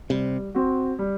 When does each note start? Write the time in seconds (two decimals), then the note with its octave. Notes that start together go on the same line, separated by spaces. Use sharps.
0.10 C3 G3
0.55 C4 F#4
0.99 G3